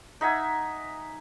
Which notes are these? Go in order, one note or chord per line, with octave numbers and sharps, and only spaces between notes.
D#4 E5 F#5 G#5